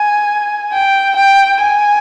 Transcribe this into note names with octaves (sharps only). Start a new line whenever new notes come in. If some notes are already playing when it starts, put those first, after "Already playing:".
Already playing: G#5
G5
G5
G#5